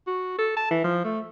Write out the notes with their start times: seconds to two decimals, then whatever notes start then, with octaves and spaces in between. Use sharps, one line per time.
0.07 F#4
0.38 A4
0.56 A5
0.71 E3
0.84 F3
1.04 A3